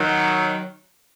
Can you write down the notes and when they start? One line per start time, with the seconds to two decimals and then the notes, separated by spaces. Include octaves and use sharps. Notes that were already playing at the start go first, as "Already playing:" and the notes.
Already playing: D#3 F#3